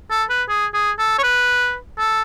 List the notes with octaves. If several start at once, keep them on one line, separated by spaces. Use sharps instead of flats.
A4
B4
G#4
G#4
A4
C#5
B4
A4